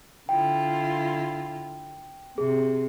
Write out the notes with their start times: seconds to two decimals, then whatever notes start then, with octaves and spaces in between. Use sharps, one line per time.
0.29 D3 E4 F4 G5
2.38 C3 G#4